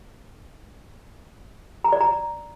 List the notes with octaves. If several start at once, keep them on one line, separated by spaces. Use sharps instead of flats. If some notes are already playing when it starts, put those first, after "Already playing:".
A#5
D5
A#5